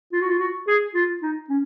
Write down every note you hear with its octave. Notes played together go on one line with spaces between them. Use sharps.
F4
F#4
F4
F#4
G#4
F4
D#4
C#4